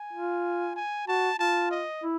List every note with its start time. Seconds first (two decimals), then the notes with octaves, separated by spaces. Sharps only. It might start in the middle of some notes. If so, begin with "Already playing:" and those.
Already playing: G#5
0.13 F4
0.76 G#5
1.08 F#4 A5
1.39 F4 A5
1.71 D#5
2.03 E4